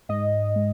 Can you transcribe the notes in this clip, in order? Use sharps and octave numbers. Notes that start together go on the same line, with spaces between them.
G#2 D#5
G#3